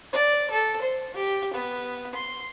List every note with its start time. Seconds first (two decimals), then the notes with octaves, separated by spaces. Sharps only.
0.13 D5
0.50 A4
0.81 C5
1.14 G4
1.53 B3
2.14 C6